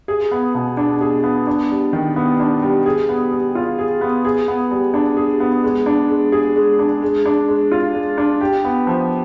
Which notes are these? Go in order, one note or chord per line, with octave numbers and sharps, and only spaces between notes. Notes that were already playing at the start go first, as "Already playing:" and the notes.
G#4
B3
B2
D4
G#4
B3
D4
G3
D#3
B3
D4
G3
G#4
B3
G3
F4
G#4
B3
G#4
B3
G3
D4
G#4
B3
G#3
D4
G#3
G#4
G#3
D4
G#3
D4
G#3
F4
G#3
D4
G4
B3
F3